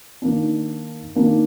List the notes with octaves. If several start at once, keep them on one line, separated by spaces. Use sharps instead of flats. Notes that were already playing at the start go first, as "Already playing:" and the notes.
D#3 A#3 D4
D#3 A#3 D4